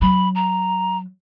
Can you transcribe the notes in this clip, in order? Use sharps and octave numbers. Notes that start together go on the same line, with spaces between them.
F#3 B5
A#5